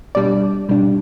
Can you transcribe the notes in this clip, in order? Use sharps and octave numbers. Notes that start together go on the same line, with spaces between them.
B2 G3 D4 D5
B2 G3 D4